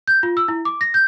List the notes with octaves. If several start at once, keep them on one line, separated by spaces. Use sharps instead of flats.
G6
F4
E6
E4
D6
A#6
G6